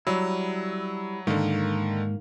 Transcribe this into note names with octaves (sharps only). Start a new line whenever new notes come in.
F#3 G3 E4
G#2 D3 D#3 A#3